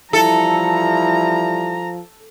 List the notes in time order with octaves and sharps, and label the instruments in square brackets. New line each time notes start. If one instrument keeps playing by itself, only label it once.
[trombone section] E3 G3 E4 [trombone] F3 [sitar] A4 [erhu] A#5